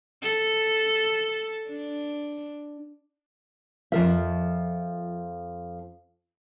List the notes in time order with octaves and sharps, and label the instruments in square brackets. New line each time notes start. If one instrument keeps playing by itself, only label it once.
[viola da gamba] A4
D4
[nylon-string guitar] F2 F3 A#4 E5